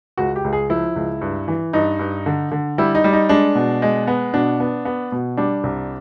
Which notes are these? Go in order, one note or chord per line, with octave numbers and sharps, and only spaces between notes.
C#2 F#4
G4
C#2
G#4
F3 E4
C#2
G2
E3
G2 D#4
G2
D3
D3
G3 E4
D#4
G3
D#4
G#3 D4
B2
G#3
B3
B2 D4
B3
B3
B2
G3 D4
C2